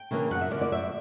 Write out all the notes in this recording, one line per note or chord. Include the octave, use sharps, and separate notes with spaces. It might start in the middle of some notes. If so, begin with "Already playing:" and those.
Already playing: G5
C#3 E3 A#3 D4
F#2 F#5
E5
D3 A#3 D5
D5
F#2 E5